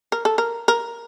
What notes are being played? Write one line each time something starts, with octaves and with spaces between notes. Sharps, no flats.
A#4
A4
A#4
A#4